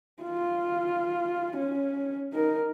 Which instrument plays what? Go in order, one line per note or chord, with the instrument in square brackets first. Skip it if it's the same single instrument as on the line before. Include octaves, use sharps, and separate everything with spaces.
[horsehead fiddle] F4
C#4
D#4 A#4